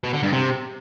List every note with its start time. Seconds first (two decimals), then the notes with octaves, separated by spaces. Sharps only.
0.03 B2
0.13 D3
0.23 G2
0.32 C3